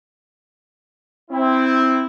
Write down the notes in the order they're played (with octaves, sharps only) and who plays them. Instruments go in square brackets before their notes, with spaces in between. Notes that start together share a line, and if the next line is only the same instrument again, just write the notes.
[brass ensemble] C4 E4